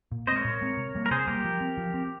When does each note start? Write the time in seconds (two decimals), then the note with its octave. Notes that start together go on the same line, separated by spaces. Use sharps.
0.12 A#2
0.27 C4 C5 D#5
0.32 G#3 A#4 C#5
0.45 A#2
0.61 G#3 C4
0.77 C3
0.95 G3 A#3
1.06 A#4
1.11 C3 G#4 C5
1.27 G3 A#3 G4 A#4
1.45 F3
1.61 C4
1.78 F3
1.94 C4